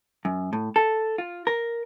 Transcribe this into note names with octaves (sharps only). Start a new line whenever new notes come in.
F#2
A2
A4
F4
A#4